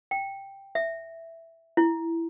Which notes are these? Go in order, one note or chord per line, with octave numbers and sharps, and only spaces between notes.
G5
E5
E4